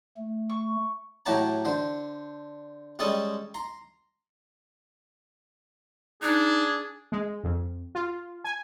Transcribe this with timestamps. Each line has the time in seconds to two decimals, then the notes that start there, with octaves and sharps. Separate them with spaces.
0.17 A3
0.49 C#6
1.26 A2 F#3 G4 C#5 A5 A#5
1.65 D3 C5
2.99 G3 G#3 C#4 A4 A5 D#6
3.54 A#5 C6
6.22 D4 D#4 G#4
7.12 G#3
7.44 F2
7.95 F4
8.44 G#5